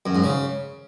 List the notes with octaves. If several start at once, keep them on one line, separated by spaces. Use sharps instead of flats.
F#2
G#2
C#3